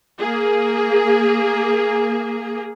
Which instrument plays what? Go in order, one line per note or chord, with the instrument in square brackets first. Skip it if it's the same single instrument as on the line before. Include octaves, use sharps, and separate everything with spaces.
[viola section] A#3 G#4